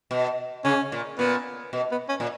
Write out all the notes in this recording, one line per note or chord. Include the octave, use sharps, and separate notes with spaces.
B2
C#3 C#4
A#2
A#2 B3
B2
B3
C#4
A#2